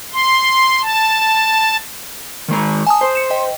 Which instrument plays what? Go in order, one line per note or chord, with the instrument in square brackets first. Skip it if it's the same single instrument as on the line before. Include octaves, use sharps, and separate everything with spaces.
[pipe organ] C6
A5
[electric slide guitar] D#3 G#3 A#5
[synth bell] G#5 A5 D#6
[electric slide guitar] C5
[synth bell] C#7 E7
D#5 G5